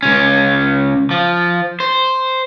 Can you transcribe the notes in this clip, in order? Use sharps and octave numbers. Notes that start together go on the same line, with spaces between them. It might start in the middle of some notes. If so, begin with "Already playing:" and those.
C#2 C#4
F3
C5